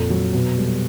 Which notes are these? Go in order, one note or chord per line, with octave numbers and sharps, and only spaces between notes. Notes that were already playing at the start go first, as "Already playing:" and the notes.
Already playing: F2 A#2 A4
F#3
B2
G3